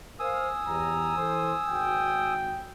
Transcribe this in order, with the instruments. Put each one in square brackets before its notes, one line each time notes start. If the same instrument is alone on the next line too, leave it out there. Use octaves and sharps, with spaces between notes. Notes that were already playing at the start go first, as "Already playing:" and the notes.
[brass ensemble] A#4 C5 F5 [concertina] G#5 D#6 E6
[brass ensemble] E2 G4 A#5
E3 A4 C5
G#1 F#4 G5